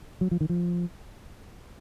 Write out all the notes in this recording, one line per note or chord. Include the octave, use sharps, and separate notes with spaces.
F#3
F3
D#3
F3